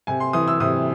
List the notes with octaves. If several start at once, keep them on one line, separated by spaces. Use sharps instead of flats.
C3 G#5
C6
E3 D#6
E6
C3 D#6